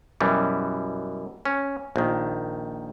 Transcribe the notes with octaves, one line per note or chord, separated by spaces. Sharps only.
F#2 B2 E3 G3
C#4
A#1 D#3